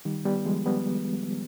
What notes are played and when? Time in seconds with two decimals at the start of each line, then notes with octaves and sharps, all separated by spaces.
0.05 D#3 G3
0.25 G3 B3
0.46 F3 G#3
0.66 G3 B3